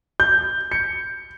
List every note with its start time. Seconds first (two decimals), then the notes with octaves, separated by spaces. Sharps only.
0.20 G6
0.71 C#7